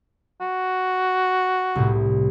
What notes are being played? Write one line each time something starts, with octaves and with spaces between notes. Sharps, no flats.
F#4
C2 A2